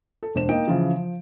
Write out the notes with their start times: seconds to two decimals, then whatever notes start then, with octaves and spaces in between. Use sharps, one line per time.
0.23 A4
0.35 E1 D4 C5 E7
0.49 A#3 D#4 D#5 G5 D7
0.68 C#3 E3 F3 F4
0.96 F3